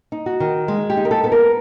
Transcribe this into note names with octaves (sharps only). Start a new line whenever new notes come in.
D#4
F#4
D#3
G#3
G4
D#4
A#4
A4
B3 A4
A#4